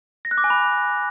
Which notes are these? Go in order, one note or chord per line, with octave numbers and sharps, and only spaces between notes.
A#6
F#6
D6
G#5
B5